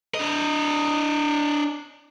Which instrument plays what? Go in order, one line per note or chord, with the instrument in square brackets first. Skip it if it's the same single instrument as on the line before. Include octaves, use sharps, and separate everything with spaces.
[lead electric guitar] D4 D#5